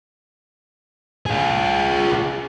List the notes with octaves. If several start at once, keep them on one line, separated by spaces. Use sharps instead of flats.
F4 G#4